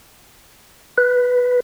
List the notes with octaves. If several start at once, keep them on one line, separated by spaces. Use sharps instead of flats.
B4